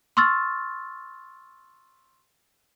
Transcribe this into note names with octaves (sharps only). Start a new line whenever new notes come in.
C6 C#6 E6 F6 A6